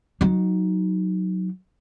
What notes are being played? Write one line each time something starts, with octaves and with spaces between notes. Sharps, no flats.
F#3 D#4